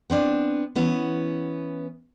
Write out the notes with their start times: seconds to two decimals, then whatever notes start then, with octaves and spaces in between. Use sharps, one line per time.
0.10 B3 C4 D4
0.75 E3 B3 C#4